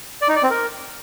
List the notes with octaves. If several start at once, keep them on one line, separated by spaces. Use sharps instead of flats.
D5
D#4
D5
C4
A#4